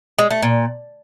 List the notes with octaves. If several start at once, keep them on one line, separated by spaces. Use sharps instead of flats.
G#3
A3
A#2